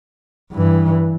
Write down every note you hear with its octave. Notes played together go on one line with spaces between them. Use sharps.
G2 E3